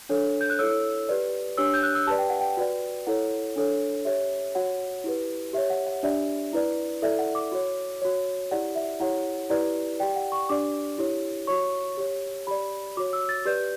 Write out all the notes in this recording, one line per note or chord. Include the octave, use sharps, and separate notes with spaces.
D4 A4 C#5
G6
F#6
E4 A4 C#5 E6
G4 B4 D5
D4 G4 C#5 E6
G6
F#6
E6
G4 B4 D5 A5
G5
F#5
G5
F#4 B4 D5
E4 A4 C#5 F#5
D4 A4 C#5
G4 C#5 E5
F#4 C#5 F#5
E4 G4 B4
G4 C#5 E5
F#5
F#5
D4 G4 D5 E5
E4 B4 D5
E4 A4 D5 E5
F#5
D6
F#4 C#5
F#4 C#5
E4 G4 D5 F#5
E5
E4 G4 C#5 F#5
E4 G4 B4 D5
G4 D5 G5
F#5
C#6
D4 G4 D5 D6
E4 G4 C#5
F#4 C#5 C#6
G4 C#5
G4 D5 B5
F#4 C#5 D6
E6
A6
G4 B4 D5 G6